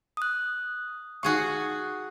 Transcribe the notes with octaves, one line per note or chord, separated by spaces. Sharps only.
D#6 F#6
D#4 F#4 G#4 F5 C#6